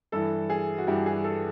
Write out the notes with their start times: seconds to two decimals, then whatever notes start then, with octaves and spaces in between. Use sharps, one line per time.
0.12 G2 E3 A4
0.50 G#4
0.78 F#4
0.87 G2 E3 G4
1.06 G#4
1.24 A4